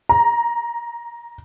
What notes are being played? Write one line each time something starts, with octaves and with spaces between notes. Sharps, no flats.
A#5